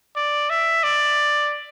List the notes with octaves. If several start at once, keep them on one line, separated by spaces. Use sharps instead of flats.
D5
E5
D5